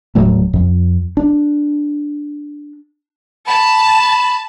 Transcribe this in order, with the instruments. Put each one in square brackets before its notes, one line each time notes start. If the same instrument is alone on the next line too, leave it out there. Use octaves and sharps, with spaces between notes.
[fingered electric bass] D#1 A2 F#3 A3
F2
D4
[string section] A5 [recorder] B5